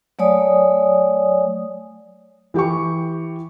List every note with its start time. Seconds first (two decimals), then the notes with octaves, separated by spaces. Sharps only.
0.19 F#3 A3 C#5 D5 G#5 D#6
2.54 E3 G4 G5 C#6